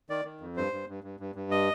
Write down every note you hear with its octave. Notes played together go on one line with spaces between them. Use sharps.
D#3 D5
D#3
F2
G2 C5
G2
G2
G2
G2
G2
D#5